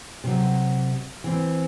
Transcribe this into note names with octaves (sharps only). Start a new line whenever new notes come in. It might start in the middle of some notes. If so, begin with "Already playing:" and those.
C3 F#3
E3 C4